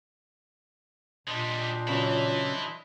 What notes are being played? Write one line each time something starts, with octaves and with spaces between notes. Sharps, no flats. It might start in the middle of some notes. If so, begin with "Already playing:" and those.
A#2 G3 G#3 D4 C5 D#5
C#3 E3 F#3 E4